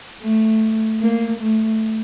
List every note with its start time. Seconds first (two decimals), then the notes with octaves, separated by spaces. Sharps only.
0.22 A3
1.01 A#3
1.41 A3